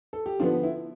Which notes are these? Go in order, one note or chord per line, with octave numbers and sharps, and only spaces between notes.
A4
G4
D3 F3 B3 D4 F4
E4